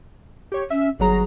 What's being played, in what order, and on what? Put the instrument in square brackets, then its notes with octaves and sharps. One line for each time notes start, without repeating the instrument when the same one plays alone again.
[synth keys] G4 C#5
[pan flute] C#4 [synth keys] E5
[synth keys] G1 F#3 A#5 [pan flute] G#4